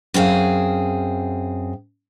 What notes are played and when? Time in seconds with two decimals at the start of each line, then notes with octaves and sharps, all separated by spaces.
0.14 F#2 C4 G#4 F5